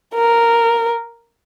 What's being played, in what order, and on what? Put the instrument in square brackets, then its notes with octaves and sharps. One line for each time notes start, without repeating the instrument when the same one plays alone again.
[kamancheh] A#4